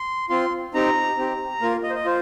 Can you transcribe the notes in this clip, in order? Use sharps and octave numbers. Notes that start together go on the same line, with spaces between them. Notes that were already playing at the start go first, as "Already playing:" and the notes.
Already playing: C6
C4 F4 C6
C4 D#4 G4 A#5
C4 G4
A#3 F4 A#4
D#5
C5
D#5
F4 C5